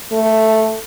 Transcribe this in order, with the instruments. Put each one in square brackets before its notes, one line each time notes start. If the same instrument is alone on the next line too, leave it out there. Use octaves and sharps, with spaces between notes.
[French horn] A3